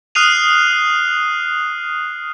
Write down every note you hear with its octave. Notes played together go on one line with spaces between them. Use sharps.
D#6 F6 F#6 C7 D#7 F7